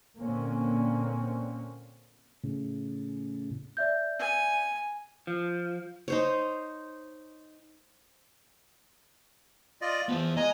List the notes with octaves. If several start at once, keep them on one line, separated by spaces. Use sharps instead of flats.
A#2 D3 A#3 C4 C#4
A2 C#3
D5 E5 G6
G#5
F3
D#4 C5 C#5
F4 D5 D#5
E3 F3 B3
G#3 D#5 G#5 A#5